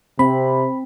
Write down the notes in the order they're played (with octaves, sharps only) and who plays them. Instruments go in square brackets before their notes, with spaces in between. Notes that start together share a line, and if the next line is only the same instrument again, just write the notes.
[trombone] C3 [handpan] C4 [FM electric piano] B5